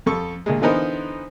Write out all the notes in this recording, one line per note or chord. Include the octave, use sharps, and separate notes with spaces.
F2 A4 C#6
D2 A#2 G#3
D3 E3 B3 D#4 A#4 C5